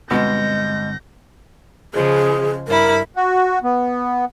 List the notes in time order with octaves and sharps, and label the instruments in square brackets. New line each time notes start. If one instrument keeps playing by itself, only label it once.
[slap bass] G1 D3 C4 [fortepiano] B2 [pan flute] G#3 [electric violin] G6 A#6
[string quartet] C#3 F3 G#3 [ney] G#4
[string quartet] G2 E4 B5 [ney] A#4
[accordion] F#4
B3